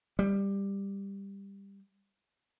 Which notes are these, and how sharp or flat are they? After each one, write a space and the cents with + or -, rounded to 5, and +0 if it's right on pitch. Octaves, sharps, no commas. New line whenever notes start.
G3 +15